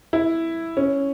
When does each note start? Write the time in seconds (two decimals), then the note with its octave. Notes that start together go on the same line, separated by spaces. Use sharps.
0.13 E4
0.77 C#4